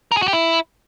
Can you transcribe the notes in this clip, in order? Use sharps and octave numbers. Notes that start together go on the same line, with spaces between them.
A#4
G#4
F#4
G4
E4